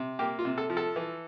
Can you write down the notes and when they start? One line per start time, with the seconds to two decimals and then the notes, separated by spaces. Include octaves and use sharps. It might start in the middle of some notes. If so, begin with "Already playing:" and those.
Already playing: C3
0.19 A#3 G4
0.39 F4
0.45 C3
0.58 A4
0.70 F3
0.77 A4
0.96 E3